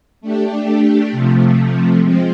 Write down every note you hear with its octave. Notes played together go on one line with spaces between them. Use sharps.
A3 D4 G4
C3 F3 A3
F3 G#3 C4